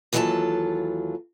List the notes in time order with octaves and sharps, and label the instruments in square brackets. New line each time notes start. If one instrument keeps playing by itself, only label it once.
[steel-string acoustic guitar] D#2 E3 F#3 F4 A4 A5